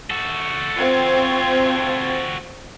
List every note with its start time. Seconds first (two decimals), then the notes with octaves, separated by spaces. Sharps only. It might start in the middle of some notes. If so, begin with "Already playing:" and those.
0.10 F#4 A4
0.76 C4 F4 G#6